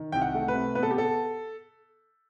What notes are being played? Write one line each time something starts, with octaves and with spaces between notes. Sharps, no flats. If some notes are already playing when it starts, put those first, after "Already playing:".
Already playing: D#3
C2 G5
F#5
A3
B4
C3
B3 B4
A4
G4
A4